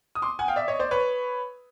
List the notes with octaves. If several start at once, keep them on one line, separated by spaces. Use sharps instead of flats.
D#6
C6 D6
F#5 G#5
F5 G5
D5 E5
C#5 D#5
C5 D5
B4 C#5